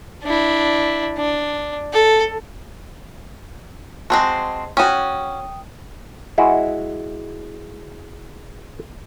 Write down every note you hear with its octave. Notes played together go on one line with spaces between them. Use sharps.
D4 E4
D4
A4
G#3 C4 F#4 A5 C7
C#4 F#4 G5 D#6 D#7
G#3 E4 F#4